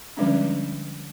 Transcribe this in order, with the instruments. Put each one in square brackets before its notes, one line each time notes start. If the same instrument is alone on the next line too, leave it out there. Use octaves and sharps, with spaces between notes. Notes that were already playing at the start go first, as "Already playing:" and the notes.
[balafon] D3 F3 G3 G#3 C#4 D4